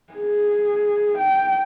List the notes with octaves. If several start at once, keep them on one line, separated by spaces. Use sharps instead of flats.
G#4
G5